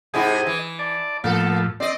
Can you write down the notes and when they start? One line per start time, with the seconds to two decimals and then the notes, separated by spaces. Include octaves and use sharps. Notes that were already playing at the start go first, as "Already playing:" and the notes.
0.14 G#2 C3 E4 G#4 D#5
0.46 E3
0.79 D5 A5
1.24 A2 F3 A#3 A4
1.80 C4 D5 D#5